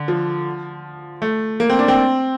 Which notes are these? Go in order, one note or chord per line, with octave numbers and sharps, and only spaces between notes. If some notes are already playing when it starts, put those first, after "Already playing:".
Already playing: D3
F3
A3
A#3
C4
D4
C4